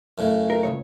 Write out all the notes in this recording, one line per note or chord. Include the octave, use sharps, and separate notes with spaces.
F#2 A2 C#3
A#4
C#2 C3 C#5